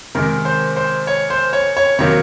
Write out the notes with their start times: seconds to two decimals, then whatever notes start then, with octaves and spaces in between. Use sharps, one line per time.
0.15 C3 D#3 G#3 A#4
0.45 C5
0.76 C5
1.07 C#5
1.30 C5
1.53 C#5
1.77 C#5
1.99 C3 D#3 F#3 A#3 C#5